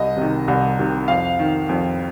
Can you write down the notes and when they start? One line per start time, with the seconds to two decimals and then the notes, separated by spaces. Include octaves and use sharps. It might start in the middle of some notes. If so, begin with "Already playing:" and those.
Already playing: C2 D#5
0.17 C3 D#3
0.48 C2
0.78 C3 D#3
1.08 F2 F5
1.39 D#3
1.69 F2